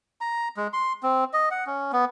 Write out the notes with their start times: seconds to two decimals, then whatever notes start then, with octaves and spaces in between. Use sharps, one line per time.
0.21 A#5
0.57 G#3
0.73 C6
1.03 C4
1.33 D#5
1.51 F#5
1.66 C#4
1.92 B3